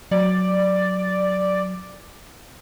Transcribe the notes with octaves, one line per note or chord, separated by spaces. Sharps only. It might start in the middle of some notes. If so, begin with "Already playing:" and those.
F#3 D5